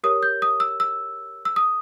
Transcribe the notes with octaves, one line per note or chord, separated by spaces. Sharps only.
G4 A#4 C#5 D#6
G6
D#6
E6
E6
E6
D#6